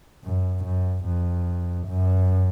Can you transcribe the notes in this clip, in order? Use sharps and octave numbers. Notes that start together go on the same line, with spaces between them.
F#2
F#2
F2
F#2